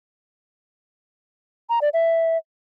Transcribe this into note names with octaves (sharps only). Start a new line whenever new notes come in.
A#5
D5
E5